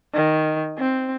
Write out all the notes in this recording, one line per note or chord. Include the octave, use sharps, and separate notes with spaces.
D#3
C4